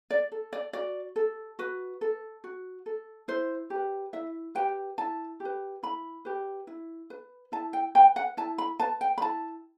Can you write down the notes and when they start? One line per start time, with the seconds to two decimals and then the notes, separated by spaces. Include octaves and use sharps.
0.11 D5
0.32 A4
0.53 D5
0.73 F#4 D5
1.16 A4
1.59 F#4 B4
2.01 A4
2.44 F#4
2.86 A4
3.28 E4 C5
3.70 G4
3.76 B4
4.13 E4 E5
4.55 G4 B4 G5
4.98 E4 A5
5.40 G4
5.45 B4
5.83 E4 B5
6.25 G4 B4
6.67 E4
7.10 B4
7.52 E4 A5
7.73 G5
7.95 B4 G5
8.16 F#5
8.37 E4 A5
8.58 B5
8.80 B4 A5
9.01 G5
9.18 B5
9.21 E4 A5